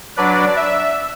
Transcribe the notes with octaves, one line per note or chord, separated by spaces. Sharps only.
F#3 D4 B4 D5
E5